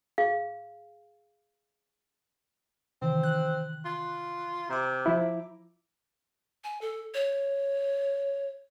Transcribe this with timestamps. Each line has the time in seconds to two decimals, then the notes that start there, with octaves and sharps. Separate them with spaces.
0.18 G#4 F5
3.02 C3 D#3 E3 C4
3.23 F#6
3.85 F4
4.69 C3 A#5 D6
5.06 F3 E4
6.64 G#5
6.81 A4
7.14 C#5